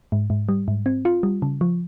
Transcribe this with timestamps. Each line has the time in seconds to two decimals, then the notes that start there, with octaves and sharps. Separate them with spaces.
0.12 G#2
0.30 G#2
0.49 G3
0.68 G#2
0.86 C4
1.05 F4
1.23 G3
1.42 C#3
1.61 F3